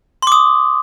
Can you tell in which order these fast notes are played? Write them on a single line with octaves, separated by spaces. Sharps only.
C6 D6 D#6